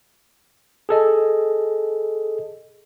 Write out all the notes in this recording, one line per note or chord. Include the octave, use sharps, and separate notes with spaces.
G#4 A4 D#5